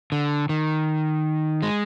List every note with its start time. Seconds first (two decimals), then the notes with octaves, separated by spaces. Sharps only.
0.12 D3
0.49 D#3
1.62 G#3